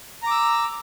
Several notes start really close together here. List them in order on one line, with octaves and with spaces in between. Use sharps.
A#5 D6 E6